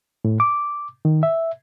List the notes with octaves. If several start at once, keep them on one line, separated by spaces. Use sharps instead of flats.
A2
D6
D#3
E5